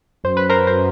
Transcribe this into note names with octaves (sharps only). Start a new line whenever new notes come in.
F#2 C5
B4
A#4 C5
A#4 C5